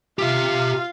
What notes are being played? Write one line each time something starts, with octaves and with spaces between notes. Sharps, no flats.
F4 G4 E5 F5